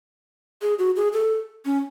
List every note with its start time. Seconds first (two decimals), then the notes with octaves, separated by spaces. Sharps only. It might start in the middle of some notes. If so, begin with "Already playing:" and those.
0.62 G#4
0.79 F#4
0.96 G#4
1.13 A4
1.66 C#4